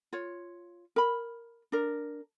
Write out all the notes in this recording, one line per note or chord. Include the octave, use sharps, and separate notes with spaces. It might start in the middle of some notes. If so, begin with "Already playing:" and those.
F4 C#5
A#4 B5
D4 A#4